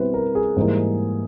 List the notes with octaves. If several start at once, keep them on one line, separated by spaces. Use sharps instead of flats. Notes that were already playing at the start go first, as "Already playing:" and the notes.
Already playing: B2 G3 C4 E4 B4 C5
A#4
G#4
G#2 E3 G3 A#3 D#4